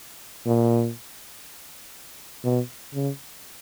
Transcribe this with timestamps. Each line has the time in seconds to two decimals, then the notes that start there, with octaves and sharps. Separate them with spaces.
0.46 A#2
2.44 B2
2.94 C#3